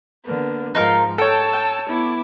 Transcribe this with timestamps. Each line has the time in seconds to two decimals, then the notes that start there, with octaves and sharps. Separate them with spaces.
0.24 D3 A#3 B3
0.75 G#2 F3 D#4 F4 A#4
1.18 A4 C#5 G5 A5 E6
1.53 G5
1.87 B3 E4 D6